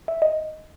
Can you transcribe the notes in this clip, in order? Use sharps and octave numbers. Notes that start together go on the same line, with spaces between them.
E5
D#5